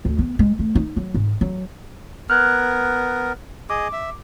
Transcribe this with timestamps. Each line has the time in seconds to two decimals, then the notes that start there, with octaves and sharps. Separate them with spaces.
0.05 D2
0.19 B3
0.39 G#3
0.59 A3
0.75 D#4
0.96 F#3
1.14 G#2
1.41 F#3
2.30 B3 A#4 F6 F#6 G#6
3.70 G#4 D#5 D6
3.93 E5